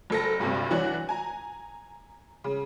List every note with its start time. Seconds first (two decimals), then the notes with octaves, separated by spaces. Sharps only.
0.10 F#1 A4 A#6
0.39 G1 D2 G2 C3
0.71 E3 F#3 D4 F#4
1.09 G#5 A#5
2.44 C#3